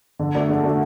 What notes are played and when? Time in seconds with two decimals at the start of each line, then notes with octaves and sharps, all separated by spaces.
0.19 D3
0.34 A3 D4 F#4
0.49 D3
0.63 A3 D4 F#4